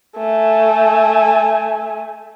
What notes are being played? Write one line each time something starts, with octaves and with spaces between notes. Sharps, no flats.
A3 G#5